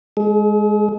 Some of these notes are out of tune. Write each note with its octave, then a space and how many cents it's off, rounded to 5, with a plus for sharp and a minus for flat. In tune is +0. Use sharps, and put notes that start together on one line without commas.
G#3 +0 G#4 +45